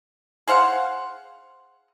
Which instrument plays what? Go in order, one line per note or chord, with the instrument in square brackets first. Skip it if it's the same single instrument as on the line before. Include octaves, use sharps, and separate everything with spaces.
[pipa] G#4 C5 F5 F#5